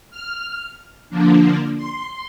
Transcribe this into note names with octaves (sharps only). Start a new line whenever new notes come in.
F6
D3 F3 A#3 D4
C6